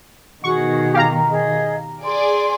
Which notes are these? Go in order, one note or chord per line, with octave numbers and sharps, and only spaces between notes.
B2 D#3 F#4 G#4 F#5 C#6
G4 F5 A#5
G#4 D#5
G#4 D5 C6